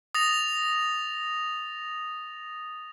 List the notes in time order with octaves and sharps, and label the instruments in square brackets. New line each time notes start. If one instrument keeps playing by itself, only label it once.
[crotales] D#6 A6 A#6 F7